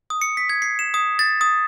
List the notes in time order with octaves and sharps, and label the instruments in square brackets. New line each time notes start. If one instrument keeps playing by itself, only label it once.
[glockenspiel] D#6
C#7
B6
G#6
C7
E7
D#6
A6
D#6